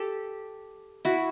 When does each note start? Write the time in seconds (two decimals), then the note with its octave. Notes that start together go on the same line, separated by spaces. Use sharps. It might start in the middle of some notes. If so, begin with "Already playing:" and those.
Already playing: G4 A4
1.05 E4 F#4